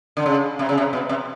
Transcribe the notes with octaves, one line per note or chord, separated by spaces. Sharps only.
D3
C#3
C3
C#3
C3
B2
C3